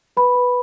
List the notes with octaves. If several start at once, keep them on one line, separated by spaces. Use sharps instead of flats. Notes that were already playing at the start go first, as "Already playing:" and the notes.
B4 B5
B4